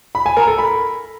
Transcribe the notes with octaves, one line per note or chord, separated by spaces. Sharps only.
B5
G#5
A#4
A4
B5